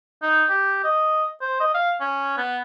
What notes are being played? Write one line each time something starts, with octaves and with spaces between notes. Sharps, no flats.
D#4
G4
D#5
C5
D#5
F5
C#4
B3